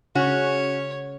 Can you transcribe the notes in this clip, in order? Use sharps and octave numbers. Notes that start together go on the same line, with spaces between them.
C#3 C#4 F#4 C#5